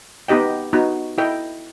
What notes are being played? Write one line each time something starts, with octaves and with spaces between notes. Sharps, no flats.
B3 D#4 G4 D#5 G5
B3 D#4 F#4
E4 A4 D#5 G5